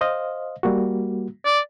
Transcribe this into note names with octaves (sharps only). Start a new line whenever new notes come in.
C5 D#5 F5
G3 A#3 F#4
D5